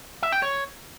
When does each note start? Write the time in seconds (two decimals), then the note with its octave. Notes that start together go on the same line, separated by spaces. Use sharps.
0.22 E5
0.32 G5
0.42 C#5